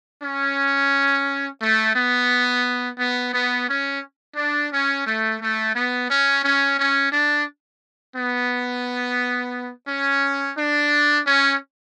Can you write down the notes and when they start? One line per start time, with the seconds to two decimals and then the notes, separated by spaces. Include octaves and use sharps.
0.23 C#4
1.61 A3
1.96 B3
2.99 B3
3.33 B3
3.68 C#4
4.36 D4
4.71 C#4
5.06 A3
5.40 A3
5.75 B3
6.09 C#4
6.44 C#4
6.78 C#4
7.12 D4
8.16 B3
9.88 C#4
10.57 D4
11.26 C#4